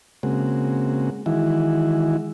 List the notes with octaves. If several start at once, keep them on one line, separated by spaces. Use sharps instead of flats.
C#3 G#3 A#3 C4 F#4
D#3 E3 G#3 E4 F#4